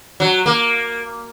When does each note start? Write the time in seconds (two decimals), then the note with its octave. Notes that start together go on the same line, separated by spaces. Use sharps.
0.20 F#3
0.46 A#3